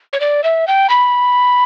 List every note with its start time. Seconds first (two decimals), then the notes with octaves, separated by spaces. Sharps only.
0.13 C#5
0.20 D5
0.44 E5
0.68 G5
0.90 B5